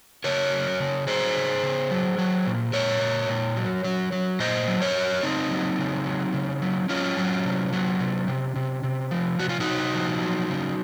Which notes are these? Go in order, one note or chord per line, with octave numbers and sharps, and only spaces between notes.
C#3 A#4 C#5
F#3
C#3
F#3 G#4 C5
C#3
C#3
F#3
F#3
A#2
A#2 A#4 C#5
A#2
A#2
F#3
F#3
F#3
A#2 C5 D#5
F#3
A#4 C#5
F#3
C#3 C4 D#4
F#3
C#3
F#3
C#3
F#3
F#3 C#4 F4
F#3
C3
F#3
C3
C3
C3
C3
F3
C3 F#4
F4
D#4 F#4
C3
F3
F#3
C#3